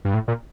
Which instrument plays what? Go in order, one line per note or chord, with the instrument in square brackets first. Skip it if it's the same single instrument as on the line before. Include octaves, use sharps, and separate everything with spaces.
[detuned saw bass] G2
A2
A#2